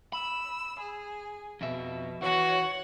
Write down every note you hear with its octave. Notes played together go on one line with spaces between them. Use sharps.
B5 E6
G#4
F2 B2 E5
E3 F#4 C#5 F#5